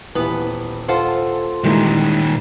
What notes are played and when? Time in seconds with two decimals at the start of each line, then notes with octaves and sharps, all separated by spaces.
0.15 D#1 E3 B3 B4
0.88 F4 A4 C5 F#5
1.64 A#2 D#3 E3 G3 G#3 A#3